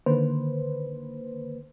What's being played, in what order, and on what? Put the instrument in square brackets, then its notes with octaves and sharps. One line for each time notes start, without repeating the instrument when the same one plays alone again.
[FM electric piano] D3 D#3 A#3 B4 C5